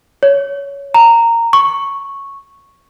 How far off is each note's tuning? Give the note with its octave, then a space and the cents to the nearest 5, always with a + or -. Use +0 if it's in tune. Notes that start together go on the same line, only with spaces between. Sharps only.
C#5 +15
A#5 -10
C#6 -5